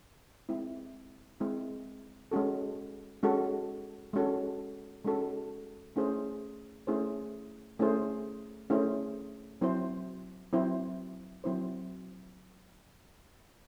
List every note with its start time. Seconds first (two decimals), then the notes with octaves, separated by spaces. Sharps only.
0.49 G#3 C4 E4
1.40 G#3 C4 E4
2.31 G#3 C#4 F#4 A4
3.23 G#3 C#4 F#4 A4
4.13 G#3 C#4 F#4 A4
5.05 G#3 C#4 F#4 A4
5.96 A3 C#4 E4 G#4 C5
6.87 A3 C#4 E4 G#4 C5
7.79 A3 C#4 E4 G#4 C5
8.70 A3 C#4 E4 G#4 C5
9.61 F#3 C4 E4 C5
10.53 F#3 C4 E4 C5
11.44 F#3 C4 E4 C5